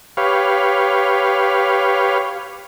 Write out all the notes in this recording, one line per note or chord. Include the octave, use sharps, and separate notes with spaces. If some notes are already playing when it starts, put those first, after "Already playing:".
G4 B4 C#5 F5